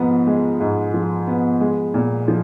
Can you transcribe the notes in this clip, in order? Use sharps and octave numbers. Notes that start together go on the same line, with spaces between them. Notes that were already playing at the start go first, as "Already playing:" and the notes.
Already playing: G#2 F3 B3
G#3
G#2
F3
B3
G#3
A#2
F3